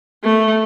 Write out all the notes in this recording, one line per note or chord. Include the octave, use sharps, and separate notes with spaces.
A3